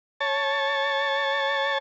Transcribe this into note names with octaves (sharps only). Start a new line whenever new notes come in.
C#5 A5